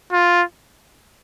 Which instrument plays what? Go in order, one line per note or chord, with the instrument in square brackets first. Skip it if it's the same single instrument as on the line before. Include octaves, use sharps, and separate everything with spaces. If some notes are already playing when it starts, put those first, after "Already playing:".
[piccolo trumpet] F4